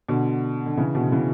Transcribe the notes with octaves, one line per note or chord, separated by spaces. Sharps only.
B2 D3
D3
C#3 E3
B2 D3
C#3 E3